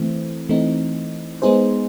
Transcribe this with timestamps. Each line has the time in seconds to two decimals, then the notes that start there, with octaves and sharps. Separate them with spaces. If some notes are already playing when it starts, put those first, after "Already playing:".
Already playing: E3 A3 C4
0.49 E3 A3 C4 D#4
1.42 G#3 B3 D#4 G#4 C5